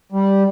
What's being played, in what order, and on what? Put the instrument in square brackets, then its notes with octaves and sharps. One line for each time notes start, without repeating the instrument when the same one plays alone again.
[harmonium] G3